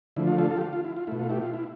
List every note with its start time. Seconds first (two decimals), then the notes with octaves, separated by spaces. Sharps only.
0.16 D3 F3 A3 E4
0.27 F4
0.38 F4 A4
0.50 F4 A4
0.57 G4
0.61 F4
0.73 F4
0.84 E4
0.96 F4
1.07 B2 A3 E4
1.19 F4
1.30 E4 G4
1.42 F4
1.54 E4